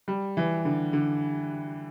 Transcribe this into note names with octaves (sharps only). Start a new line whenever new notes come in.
G3
E3
D3
D3